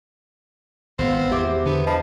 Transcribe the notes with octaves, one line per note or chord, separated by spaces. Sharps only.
G#1 B3 C4 F5
E2 G4 C5 E5 D6
D3 B3
F3 D#5 A5 B5